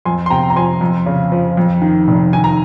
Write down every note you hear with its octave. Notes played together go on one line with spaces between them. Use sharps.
F2 G#5 C6
C6
C3 G5 A#5
A#5
F3 G#5 C6
F2
C#3
F3
F2
D#3
F1
D#3 G#5
A#5